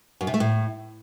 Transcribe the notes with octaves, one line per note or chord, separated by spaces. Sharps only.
F#2
C3
A3
A2